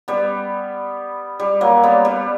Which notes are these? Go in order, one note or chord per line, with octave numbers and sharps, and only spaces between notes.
G3 B3
G3
F#3 A#3
G3 B3
G3